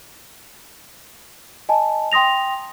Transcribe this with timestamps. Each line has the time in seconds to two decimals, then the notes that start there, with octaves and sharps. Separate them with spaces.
1.69 D#5 G#5 A5
2.12 G5 C6 D#6 A#6 F7